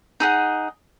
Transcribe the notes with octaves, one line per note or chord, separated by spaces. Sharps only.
D#4 G#4 F#5